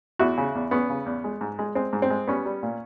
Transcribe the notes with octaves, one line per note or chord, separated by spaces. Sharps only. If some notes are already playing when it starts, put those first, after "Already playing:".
E2 E4 F#4
C#3
E2
E2 B3 C#4
C#3
E2
G#3
G#2
G#3
G#3 C4
G#2
C4
G#3
G3 B3 C#4
G3
A#2